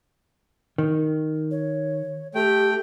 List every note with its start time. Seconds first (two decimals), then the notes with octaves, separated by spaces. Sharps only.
0.78 D#3
1.51 C#5
2.35 A3 G4 G5